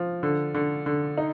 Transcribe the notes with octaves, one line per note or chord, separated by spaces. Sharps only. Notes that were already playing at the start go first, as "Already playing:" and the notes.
Already playing: F3
D3
D3
D3
D#4